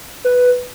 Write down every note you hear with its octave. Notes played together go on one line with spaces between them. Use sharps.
B4